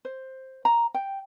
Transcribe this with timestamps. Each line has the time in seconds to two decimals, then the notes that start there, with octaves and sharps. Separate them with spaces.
0.05 C5
0.65 A#5
0.95 G5